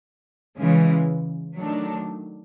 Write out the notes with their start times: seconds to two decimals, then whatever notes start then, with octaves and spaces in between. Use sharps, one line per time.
0.58 C#3 E3 G#3
1.58 D#3 F#3 A3 D4